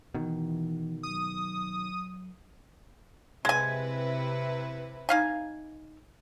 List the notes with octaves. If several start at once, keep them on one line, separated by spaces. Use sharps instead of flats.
B2 D#3 E3
F#3 D#6
C3 G#3 E4 B4 G#5
D#4 F5 G#5